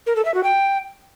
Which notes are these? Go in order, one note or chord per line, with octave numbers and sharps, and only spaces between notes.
A#4
A4
E5
F#4
G5